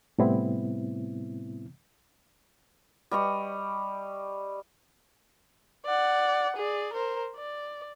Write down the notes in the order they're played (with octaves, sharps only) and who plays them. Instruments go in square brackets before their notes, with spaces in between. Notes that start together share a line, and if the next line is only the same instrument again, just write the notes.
[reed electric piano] A2 C3 G3 B3 C4 E4
[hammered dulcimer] G3 D#5 C#6
[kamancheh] D5 F#5
G#4 D5
A#4 C5
D5